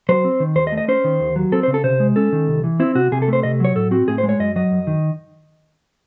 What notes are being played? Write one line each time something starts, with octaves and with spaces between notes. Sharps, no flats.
F#3 C5
C4
D#3
D#2 C5
D#5
A3
D#5
C#4 C5
D#3
D#2
F#3
C4 A4
C5
C#3
A4
C3 C5
G#3
C#4 A4
D#3
C2
E3
C4 E4
C3 F#4
C3 G#4
A4
A3 C5
C3 D#5
F#3 C#5
A2 A4
C4 F#4
A2 G#4
C5
G#3
C#5
F#2 D#5
F#3 D#5
F#2
D#3